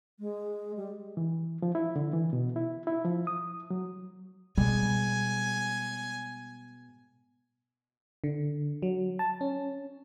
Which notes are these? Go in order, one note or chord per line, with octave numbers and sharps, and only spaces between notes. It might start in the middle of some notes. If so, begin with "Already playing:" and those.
G#3
G3
E3
F3
E4
D3
E3
B2
E4
E4
F3
D#6
F#3
B2 G3 G#3 G#5
D3
F#3
A5
C#4